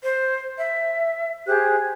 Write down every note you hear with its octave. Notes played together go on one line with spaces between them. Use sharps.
C5
E5
G4 G#4 C5 F#6